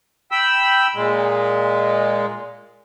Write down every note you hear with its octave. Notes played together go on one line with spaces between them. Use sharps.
G5 B5 E6
A#2 G#3